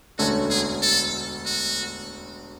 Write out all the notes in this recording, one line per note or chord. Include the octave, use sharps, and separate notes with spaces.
E1 D2 D3 A3 C#4 F#4
G#4
A4
F#4